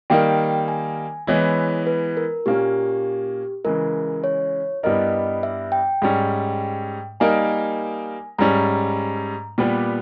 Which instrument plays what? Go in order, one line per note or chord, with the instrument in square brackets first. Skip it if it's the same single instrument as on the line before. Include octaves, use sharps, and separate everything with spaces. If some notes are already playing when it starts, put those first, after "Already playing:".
[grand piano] D#3 G3 A#3 D#4 [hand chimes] G5
[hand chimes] G#5
[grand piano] E3 G#3 B3 E4 [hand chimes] C#5
[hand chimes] B4
A#4
[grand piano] A#2 A#3 C#4 [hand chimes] G4
[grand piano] C#3 E3 G#3 [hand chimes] A#4
[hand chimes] C#5
[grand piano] G2 G3 B3 E4 A#4 [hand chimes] D#5
[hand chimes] E5
G5
[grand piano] G#2 G3 C#4
[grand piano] G3 A#3 D#4 A#4 [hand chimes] G#5
[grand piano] G#2 G3 C#4 [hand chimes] A#5
[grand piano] A#2 G3 B3 G4 B4